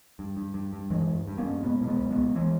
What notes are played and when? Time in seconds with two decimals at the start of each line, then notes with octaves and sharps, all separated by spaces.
0.19 G2
0.37 G2
0.54 G2
0.73 G2
0.90 G2 E3 G#3
1.09 G2
1.28 G2
1.38 A#3 C#4
1.45 G2
1.63 B2 G#3 B3
1.81 B2
1.87 G#3 B3
2.00 C#2
2.11 G#3 B3
2.18 C#2
2.36 E3 G#3